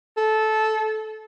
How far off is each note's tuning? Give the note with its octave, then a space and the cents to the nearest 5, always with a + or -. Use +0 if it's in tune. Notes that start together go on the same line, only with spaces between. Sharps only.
A4 -15